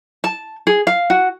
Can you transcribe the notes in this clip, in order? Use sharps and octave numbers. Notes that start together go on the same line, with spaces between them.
A5
G#4
F5
F#4